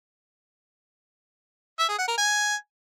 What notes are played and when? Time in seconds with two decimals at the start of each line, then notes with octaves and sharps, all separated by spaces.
1.79 E5
1.89 G#4
1.98 F#5
2.08 A#4
2.17 G#5